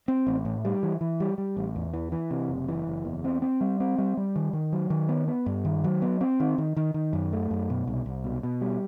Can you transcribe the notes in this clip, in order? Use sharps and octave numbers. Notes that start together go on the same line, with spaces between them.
C4
A1
A2
G3
E3
E3
G3
G3
A1
E2
E3
E3
C3
F#1
E3
F#1
E2
C4
C4
G3
C4
G3
G3
D#3
D#3
F#3
D#3
B3
B3
G2
D#3
F#3
B3
C4
D#3
D#3
D#3
D#3
F#2
A3
F#2
B2
C2
C2
B2
B2
G3